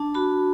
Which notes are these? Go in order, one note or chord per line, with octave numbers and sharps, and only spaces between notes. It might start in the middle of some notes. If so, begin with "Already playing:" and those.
Already playing: D4 A5
F#4 B5